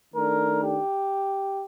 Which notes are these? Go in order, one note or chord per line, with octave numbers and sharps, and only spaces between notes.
D#3 A3 D4 A#4
G4